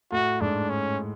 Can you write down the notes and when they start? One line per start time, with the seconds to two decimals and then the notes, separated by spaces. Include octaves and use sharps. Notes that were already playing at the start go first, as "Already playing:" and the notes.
0.12 A2 A3 F#4
0.41 G#2 G#3 D4
0.70 C#4